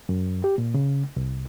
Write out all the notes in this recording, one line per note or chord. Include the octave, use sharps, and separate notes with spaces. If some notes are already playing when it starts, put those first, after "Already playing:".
F#2
G4
A#2
C#3
C2